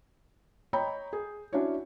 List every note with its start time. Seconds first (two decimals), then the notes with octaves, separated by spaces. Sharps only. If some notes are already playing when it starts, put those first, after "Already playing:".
0.73 C#5 D#5 G5 A#5 B5 G6
1.13 G#4
1.53 C#4 D4 E4 F#4 C#5